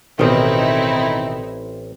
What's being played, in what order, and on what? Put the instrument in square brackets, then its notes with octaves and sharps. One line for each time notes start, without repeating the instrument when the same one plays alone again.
[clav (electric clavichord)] A1 G5 [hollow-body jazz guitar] B2 D#3 [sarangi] C4 [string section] D#4 E4